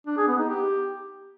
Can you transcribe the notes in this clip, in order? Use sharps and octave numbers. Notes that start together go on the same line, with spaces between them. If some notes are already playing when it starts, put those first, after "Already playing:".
D4
G#4
B3
D#4
G4